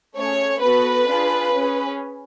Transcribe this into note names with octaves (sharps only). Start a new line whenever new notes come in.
A3 C#4 G#4 C#5
B3 F#4 A4 B4
D4 F4 G#4
C#4 G#4